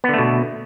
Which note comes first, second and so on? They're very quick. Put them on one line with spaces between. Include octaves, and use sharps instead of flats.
B3 D3 A3 B2